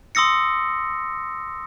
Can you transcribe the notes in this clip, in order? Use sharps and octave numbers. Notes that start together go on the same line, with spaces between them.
C6 D#6 E6 A#6 C#7